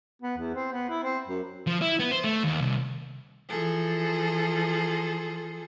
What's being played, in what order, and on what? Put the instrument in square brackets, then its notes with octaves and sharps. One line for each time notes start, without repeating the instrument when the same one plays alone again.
[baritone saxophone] B3
E2
C4
B3
E4
C4
F#2
[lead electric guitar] F3
E4
B3
C5
A3
D#2
C2
[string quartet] E3 F3 G#4 A4